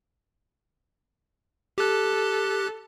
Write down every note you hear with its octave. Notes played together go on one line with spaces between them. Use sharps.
G4 A4 F#6